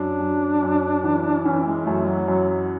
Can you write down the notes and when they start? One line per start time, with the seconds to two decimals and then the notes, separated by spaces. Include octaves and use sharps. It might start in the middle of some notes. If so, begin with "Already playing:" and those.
Already playing: F#2 D4
0.20 F#2
0.62 F#2
1.04 E3
1.45 E3 C#4
1.66 G#3
1.87 F#2 A3
2.08 F#3
2.28 F#2 F#3
2.49 F#3